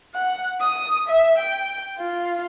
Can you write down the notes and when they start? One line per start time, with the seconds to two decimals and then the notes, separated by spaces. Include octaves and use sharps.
0.14 F#5
0.61 D#6
1.08 E5
1.38 G5
1.98 F4